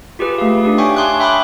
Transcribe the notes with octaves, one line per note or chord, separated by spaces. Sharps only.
F4 G4 G#4 B4
A3 F5
D4 D#4 G4
C#5 E5 G5 G#5 C#6
G#5 A5 C6 D6 D#6 F#6
E5 G5 B5 C#6 D6 F#6